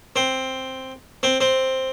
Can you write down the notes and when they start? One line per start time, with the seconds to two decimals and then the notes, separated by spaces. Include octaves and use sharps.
0.16 C4
1.23 C4
1.41 C4